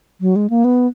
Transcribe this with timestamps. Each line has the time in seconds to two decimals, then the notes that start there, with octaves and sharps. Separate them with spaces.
0.21 F#3
0.36 G#3
0.50 A#3
0.64 B3